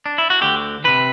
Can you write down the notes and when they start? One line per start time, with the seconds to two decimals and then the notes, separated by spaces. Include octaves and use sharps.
0.06 D4
0.18 E4
0.30 F#4
0.41 D2 D3 G4
0.84 C3 E3 B4